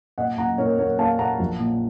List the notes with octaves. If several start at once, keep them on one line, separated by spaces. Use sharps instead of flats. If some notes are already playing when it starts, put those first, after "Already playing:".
A#2 D#5 F#5
A#2 F#5 A#5
A#2 A#4 C#5
A#3 A#4 C#5
A#3 F5 A5
A#2 F#5 A#5
A#1
A#2